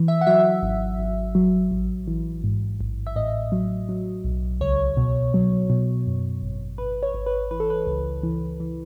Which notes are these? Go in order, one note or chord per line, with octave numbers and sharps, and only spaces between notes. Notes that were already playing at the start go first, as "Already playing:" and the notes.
Already playing: E3
E5
F#5
F#3 E5
G#1
G#1
F#3
A1
E3
G#2
A1
E5
A2 D#5
F#3
F#3
B1
C#2 C#5
B2
F#3
B2
F#2
G#1
G#1 B4
C#5
G#1
B4
E3 B4
A4
B4
C#2
E3
E3